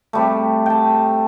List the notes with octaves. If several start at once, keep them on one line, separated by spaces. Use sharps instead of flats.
C3 G3 A3
G5 A5